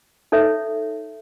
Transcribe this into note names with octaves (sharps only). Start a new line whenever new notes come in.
D#4 A4 C#5 E5